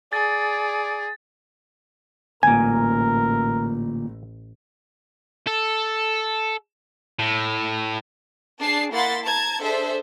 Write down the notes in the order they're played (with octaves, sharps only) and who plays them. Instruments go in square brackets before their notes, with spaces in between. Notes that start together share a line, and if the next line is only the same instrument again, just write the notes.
[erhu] G#4 [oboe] D5 [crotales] A6
[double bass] A1 [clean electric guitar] D2 A#2 [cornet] A#4 [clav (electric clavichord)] G#5
[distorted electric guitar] A4
A2
[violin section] D4 G#4 A5 C7
A#3 E4 F#5 C6 A6 B6
A5 A#5 G#6
D4 G#4 A4 C5 E5